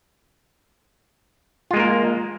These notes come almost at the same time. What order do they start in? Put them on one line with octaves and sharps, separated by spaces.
F4 G#3 A#3 A#4